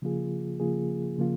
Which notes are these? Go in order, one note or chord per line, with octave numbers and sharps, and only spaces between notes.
C#3 F3 A#3 F4 G#4
C#3 F3 A#3 F4 G#4
C#3 F3 A#3 F4